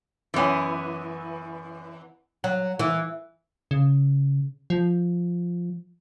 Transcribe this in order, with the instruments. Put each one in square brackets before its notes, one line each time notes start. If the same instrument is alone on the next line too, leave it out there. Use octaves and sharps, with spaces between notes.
[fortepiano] F#2 C#4 G#5 [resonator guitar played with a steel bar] E3 B3
[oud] F#3
E3
[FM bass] C#3
F3